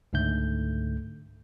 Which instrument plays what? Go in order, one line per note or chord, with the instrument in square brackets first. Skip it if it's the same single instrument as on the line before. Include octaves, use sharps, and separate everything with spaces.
[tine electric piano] C#2 G#2 D3 A3 G6